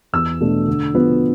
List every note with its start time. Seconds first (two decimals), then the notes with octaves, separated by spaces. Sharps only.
0.13 E2 E6
0.40 B2 A3 D4
0.68 D3
0.94 F3 B3